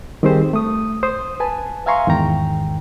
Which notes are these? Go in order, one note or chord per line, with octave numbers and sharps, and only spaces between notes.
D#3 G3 C4 G4 G#4 C5
A3 D#6
C5 D#6
B4 G#5 A5
E5 F5 G#5 A#5 C6 C#6
E2 G#2 D#3 G5 A#5